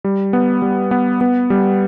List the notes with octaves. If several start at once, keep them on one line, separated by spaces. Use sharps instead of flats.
G3
B3
G3
B3
B3
G3